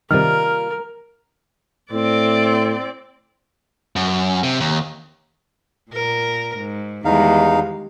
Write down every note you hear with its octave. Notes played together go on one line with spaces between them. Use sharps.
C3 D#3 G3 A#3 F4 A#4 F6
A2 C4 D5
F#2
C3
D#2
A#2 A#4
G#2
E2 D#3 G3 G#3 D#4 F5